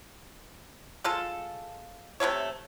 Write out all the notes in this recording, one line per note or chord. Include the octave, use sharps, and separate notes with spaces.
G#3 F4 A4
C3 G3 A3 C#5